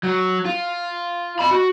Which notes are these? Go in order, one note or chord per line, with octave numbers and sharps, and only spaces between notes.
F#3
F4
D#5 B5
F#4